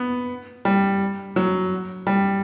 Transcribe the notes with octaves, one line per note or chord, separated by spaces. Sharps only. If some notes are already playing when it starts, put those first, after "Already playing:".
Already playing: B3
G3
F#3
G3